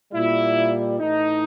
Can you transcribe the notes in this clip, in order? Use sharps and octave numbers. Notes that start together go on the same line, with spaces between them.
A#2 G3 E4
A2 E3 A3 D#4